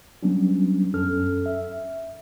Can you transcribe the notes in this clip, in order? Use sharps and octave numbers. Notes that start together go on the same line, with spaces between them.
F#3 G3 B3 C#4 D4
F#2 C#4 A4 F6
E5